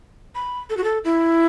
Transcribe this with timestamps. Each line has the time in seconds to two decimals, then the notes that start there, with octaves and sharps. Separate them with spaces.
0.35 B5
0.70 A4
0.77 F#4
0.84 A4
1.04 E4